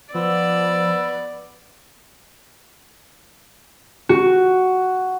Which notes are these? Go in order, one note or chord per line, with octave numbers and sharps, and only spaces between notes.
F3 B3 D5 E6
F#4